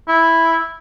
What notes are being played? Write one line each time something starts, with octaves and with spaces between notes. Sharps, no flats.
E4